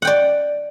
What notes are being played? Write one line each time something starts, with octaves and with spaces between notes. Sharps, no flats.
D5 F#5 G5